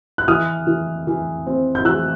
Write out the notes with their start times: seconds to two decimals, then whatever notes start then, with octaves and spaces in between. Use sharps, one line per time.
0.18 F#6
0.28 E3 D#6 F6
0.67 E3
1.07 E3
1.47 C4
1.75 G6
1.85 E3 E6 F#6